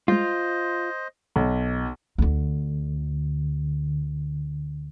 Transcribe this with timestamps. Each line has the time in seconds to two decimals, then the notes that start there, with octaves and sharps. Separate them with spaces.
0.08 G3 G#3 F4 C5 D#5
1.36 B1
2.18 D2 D3